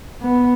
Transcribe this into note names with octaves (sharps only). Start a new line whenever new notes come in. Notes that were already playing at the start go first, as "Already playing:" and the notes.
B3